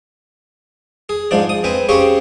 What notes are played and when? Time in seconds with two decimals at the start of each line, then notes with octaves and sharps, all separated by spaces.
1.09 G#4
1.31 G#2 F3 D4 D5
1.49 D#6
1.64 C4 B4 G#5
1.89 C#3 C4 G4 G#4 C#5